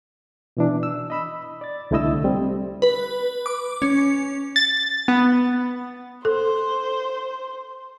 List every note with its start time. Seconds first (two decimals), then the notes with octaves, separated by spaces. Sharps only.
0.57 B2 E3 D4
0.83 E6
1.10 D#5 B5 E6
1.61 D5 A6
1.91 C2 D3 A3 E4 D#5 E6
2.24 G3 C4
2.82 B4
3.46 D6
3.82 C#4
4.56 A6
5.08 B3
6.25 A4 C5